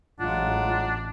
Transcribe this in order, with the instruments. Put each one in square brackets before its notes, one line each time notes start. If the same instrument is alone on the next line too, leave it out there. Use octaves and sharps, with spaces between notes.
[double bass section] A1 [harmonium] F#3 G#3 F#5 [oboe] D4 [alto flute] F4